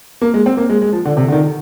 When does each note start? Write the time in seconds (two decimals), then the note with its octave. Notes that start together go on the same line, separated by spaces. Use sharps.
0.21 A#3
0.34 G#3
0.46 C4
0.57 A#3
0.69 G#3
0.82 G#3
0.92 F3
1.05 D3
1.17 C3
1.28 D3
1.32 D#3